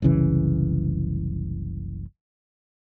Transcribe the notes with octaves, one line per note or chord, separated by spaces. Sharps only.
F#1 C2 C#3 E3